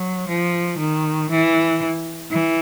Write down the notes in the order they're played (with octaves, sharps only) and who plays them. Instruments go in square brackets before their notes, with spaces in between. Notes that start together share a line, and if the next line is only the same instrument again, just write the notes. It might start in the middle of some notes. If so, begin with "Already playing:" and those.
Already playing: [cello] F#3
F3
D#3
E3
E3